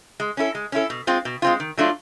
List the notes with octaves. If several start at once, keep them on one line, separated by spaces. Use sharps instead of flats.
G#3
C#4 E4 A4
G#3
C#4 E4 A4
B2
G#3 C4 F4
B2
G#3 C4 F4
D#3
F#3 A3 D4 F4